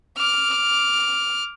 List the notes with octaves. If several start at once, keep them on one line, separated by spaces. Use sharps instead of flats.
D6 F6